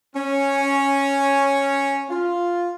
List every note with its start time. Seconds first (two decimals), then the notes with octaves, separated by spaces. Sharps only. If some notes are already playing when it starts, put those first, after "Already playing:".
0.16 C#4
2.11 F4